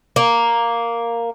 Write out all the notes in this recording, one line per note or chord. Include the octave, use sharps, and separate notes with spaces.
A#3